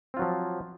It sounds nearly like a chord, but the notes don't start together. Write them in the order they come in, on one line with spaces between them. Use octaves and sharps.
C4 F4 F#3 F3